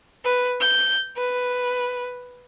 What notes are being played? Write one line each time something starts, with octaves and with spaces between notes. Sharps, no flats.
B4
G6
B4